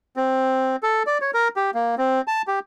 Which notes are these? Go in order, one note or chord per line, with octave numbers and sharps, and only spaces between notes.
C4
A4
D5
C#5
A#4
G4
A#3
C4
A5
G4